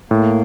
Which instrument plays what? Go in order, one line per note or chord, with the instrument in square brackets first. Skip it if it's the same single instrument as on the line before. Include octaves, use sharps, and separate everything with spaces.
[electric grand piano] A2 [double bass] A#3